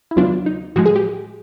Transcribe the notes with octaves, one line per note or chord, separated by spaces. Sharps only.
E4
D#2 C#3 F#3 B3 D4 F4
D#4
A2 F3 G#3 F#4
G#4
G4